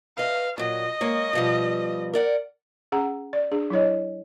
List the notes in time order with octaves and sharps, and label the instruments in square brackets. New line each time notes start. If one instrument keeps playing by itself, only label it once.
[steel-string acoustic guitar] B4 D#5 [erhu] F5
[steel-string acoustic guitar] A#2 F#3 [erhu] D#5
[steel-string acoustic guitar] G#3 A#3 C#5
B2 F3 G3
A#4 D5 F#5
[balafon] C#4 G#4 F#5 A#5
D5
D4 G#4
F#3 E4 C#5 D#5